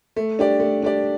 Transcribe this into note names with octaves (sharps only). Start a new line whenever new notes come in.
A3
D4 G4 D5
A3
D4 G4 D5